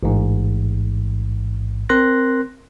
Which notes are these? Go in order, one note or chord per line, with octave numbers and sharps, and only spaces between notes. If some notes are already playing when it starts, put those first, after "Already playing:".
A1 G#2
C4 A#4 C6 F#6 A#6